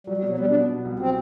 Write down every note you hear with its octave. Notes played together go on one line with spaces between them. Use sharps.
F#3 G3
G3
B2
F#3
G3 B3
D4
B3
B2
C2
F#3 C4